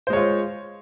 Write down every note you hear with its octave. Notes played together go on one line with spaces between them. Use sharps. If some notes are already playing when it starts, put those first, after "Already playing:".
G#3 F4 C5 C#5